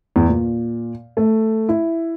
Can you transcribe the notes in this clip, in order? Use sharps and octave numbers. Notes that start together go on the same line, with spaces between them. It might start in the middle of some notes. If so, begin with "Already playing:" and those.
E2
A#2
A3
E4